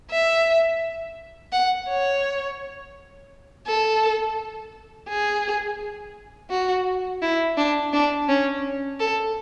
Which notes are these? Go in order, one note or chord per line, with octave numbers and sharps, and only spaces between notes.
E5
F#5
C#5
A4
G#4
F#4
E4
D4
D4
C#4
A4